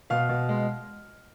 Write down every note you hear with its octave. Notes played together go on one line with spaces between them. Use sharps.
B2 F5 F6
B2
G#3